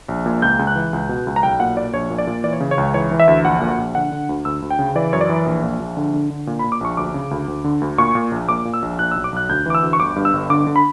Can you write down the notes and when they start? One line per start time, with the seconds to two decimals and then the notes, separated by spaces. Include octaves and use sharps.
0.08 A#1
0.26 A#2
0.42 C#2 G6
0.59 C#2
0.67 F#6
0.76 E3
0.93 C#2
1.09 B2
1.27 C#2
1.36 A#5
1.43 B1 G5
1.60 A#2 F#5
1.77 A#2 D5
1.94 A#1 C#5
2.10 A#2
2.18 D5
2.27 A#2
2.44 E3 D5
2.53 C#5
2.60 C#3
2.71 C#5
2.78 C#2
2.94 E3 C#5
3.11 E3
3.20 E5
3.28 D2
3.44 A#1 F#5
3.61 A#2
3.78 A#1
3.95 D3 F#5
4.12 D3
4.29 D2
4.45 D2 E6
4.62 D2
4.70 G5
4.79 C#3
4.95 E3 D5
5.13 F#2 C#5
5.21 D5
5.29 E3
5.46 A#1
5.63 A#2
5.80 A#1
5.97 D3
6.14 D3
6.30 D3
6.47 A#2
6.59 B5
6.64 A#2
6.72 D6
6.81 A#1 C#6
6.97 D2 D6
7.14 C#3
7.31 D2
7.48 D2
7.64 D3
7.81 D2
7.98 A#2 C#6
8.15 A#2
8.31 A#1
8.49 A#2 D6
8.65 A#2
8.74 E6
8.82 A#1
8.99 A#2 F#6
9.11 E6
9.16 B1
9.24 D6
9.32 B1 F#6
9.49 D2 G6
9.66 E3 D6
9.75 E6
9.83 D2
9.93 C#6
10.00 G1 D6
10.16 G2
10.25 E6
10.33 G1
10.50 D3 D6
10.67 D3
10.76 B5